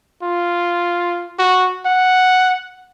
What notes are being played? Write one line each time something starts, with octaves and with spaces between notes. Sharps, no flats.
F4
F#4
F#5